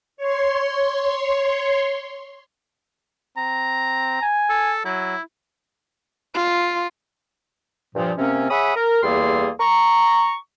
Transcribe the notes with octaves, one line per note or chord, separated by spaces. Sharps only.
C#5 C6
C4 A#5
G#5
A4
F#3 E4
F4
G2 A#2 F3
C3 A#3 C4 C#4
G#4 C#5 E5 F#5 B5 D#6
A#4
E2 G3 A#3 G#4 A4 C6
A#5 C#6